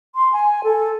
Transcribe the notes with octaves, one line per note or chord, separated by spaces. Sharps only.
C6
G#5
A4